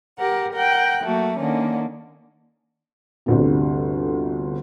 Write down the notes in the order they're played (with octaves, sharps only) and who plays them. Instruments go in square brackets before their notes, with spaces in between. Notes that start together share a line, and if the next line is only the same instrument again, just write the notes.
[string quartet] G4 A#4 F#5
A#4 F#5 G5 F#6
F#3 A3 A#3 F#4
D3 D#3 A#3 C#4
[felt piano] G1 D2 C3